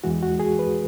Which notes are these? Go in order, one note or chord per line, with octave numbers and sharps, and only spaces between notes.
E2 E3 G#3 F#4
F#4
G#4
B4